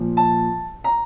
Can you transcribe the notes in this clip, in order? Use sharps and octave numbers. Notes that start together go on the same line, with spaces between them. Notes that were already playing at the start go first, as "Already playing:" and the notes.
Already playing: A#2 F3
A5
A#5